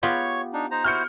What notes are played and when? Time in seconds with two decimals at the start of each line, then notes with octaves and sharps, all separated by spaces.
0.03 B3 F4 G4 C#5 C#6
0.53 D4 D#4
0.71 D#4 C5 A#5
0.84 E4 F#4 C5 F6 G6 C#7